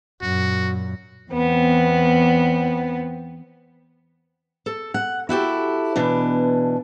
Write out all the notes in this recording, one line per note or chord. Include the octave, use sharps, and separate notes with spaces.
F#2 A#2 F#4
E2 B3 C4
A4
F#5
E4 F#4 G4 A4
B2 E3 D4